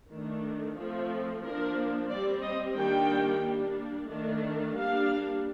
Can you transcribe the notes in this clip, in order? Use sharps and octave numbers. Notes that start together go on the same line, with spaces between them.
D#3 A3 D4
F3 A3 C4
F3 A#3 D4 A#4
G3 C4 D5
D#5
D#3 G3 A#3 D4 G5
G3 A#3 D4
D#3 A3 D4
G3 A#3 D4 F5